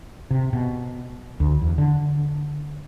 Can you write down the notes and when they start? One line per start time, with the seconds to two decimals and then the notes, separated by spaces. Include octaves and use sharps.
0.31 C3
0.53 B2
1.40 D2
1.61 E2
1.78 D3